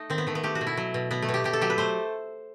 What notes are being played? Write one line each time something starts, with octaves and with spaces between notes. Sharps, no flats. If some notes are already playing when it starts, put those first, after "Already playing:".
Already playing: A3 D#4
D#3 C4
B3
D#3 A3
B3
A3 G4
F#4
B2
E4
F#3
B2
B2 B3
A3
B2
G4
B2 G4
A4
F#3 G4
B4
A3 C5